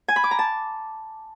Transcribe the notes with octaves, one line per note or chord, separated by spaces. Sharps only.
G#5
B5
D6
A#5
A5